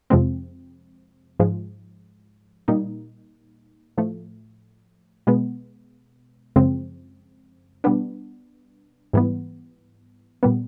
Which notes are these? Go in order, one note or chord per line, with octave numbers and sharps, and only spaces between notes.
F2 C3 F3 G#3 C4
G#2 F3 G#3
A#2 G3 A#3 D#4
A2 F3 A3
B2 G#3 B3
F#2 C#3 F3 G#3 C4
B2 G3 B3 D4
G#2 E3 G3 B3
A#2 G3 B3